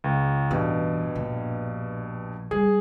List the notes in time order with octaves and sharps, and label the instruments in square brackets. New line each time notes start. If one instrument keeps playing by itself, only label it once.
[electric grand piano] C#2
[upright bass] A1 [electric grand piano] G2 B2
[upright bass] A#1
[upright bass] G3 [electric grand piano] G#4